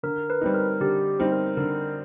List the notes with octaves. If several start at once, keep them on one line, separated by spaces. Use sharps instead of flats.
D3 A#4
B4
G3 C4 D#4
A#4
D3 G4
G3 C4 D#4
A#4
D3 A#4